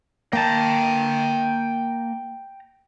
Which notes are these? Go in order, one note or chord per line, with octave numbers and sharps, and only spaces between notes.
A#3 G5 A5 A#5